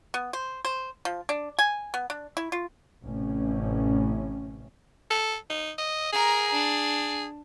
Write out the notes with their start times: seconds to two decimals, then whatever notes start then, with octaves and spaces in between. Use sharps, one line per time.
0.14 B3
0.33 C5
0.65 C5
1.05 F3
1.29 D4
1.59 G#5
1.94 B3
2.10 D4
2.37 E4
2.52 F4
3.03 A1 A2 C3 C#4
5.10 A4
5.50 D#4
5.78 D#5
6.13 G#4 A#4 A#5
6.52 D4